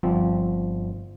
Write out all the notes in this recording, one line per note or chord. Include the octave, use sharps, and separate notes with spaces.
G1 F3 C4